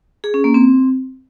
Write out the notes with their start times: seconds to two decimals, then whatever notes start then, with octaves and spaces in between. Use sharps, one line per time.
0.24 G#4
0.34 C#4
0.44 A#3
0.54 C4